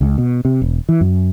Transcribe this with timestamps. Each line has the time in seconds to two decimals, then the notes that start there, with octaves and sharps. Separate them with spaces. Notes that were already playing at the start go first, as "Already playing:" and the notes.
0.01 C#2
0.18 B2
0.45 C3
0.62 E1
0.89 E3
1.01 F#2